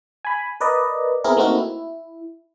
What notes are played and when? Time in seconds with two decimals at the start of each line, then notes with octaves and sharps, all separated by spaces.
0.25 G#5 B5
0.60 A#4 B4 D5 D#5
1.24 B3 C4 E4 G#4 A#4
1.37 A3 A#3 C4 D#4 F#4 A#4
1.55 E4